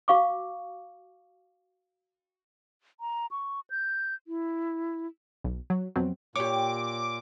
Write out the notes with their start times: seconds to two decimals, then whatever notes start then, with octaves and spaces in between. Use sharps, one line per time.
0.08 F#4 F5 C#6 D6
3.00 A#5
3.31 C#6
3.70 G6
4.27 E4
5.44 B1
5.70 F#3
5.96 F2 B2 F#3 C4
6.36 A#2 G4 C#5 D6